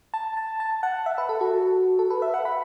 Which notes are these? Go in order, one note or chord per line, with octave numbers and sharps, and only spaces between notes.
A5
A5
A5
F#5
E5
B4
A4
F#4
A4
B4
E5
F#5
B5